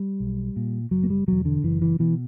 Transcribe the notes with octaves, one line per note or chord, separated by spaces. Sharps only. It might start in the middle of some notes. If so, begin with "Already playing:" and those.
Already playing: G3
B1
A#2
F#1 F#3
A#3
G3
E2 B2 F#3
D3
F#1 E3
E3
B2 E3